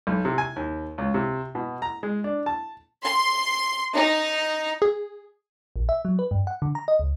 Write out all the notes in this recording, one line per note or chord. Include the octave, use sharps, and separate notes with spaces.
B1
C3
G#5
D#2
C#2
C3
B2
A#5
G#3
D4
A5
C6
D#4
G#4
A#1
E5
F#3
B4
G2
F#5
D3
A#5
D#5
C#2